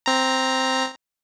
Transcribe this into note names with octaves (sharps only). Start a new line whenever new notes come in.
C4 A#5